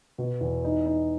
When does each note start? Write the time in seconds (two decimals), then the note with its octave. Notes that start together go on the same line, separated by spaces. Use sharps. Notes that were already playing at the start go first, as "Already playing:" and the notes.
0.18 B2
0.41 E2
0.64 D#4
0.86 D#4